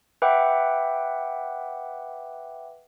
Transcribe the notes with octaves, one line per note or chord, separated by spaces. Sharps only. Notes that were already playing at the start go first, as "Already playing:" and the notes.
B4 E5 F#5 G5 D6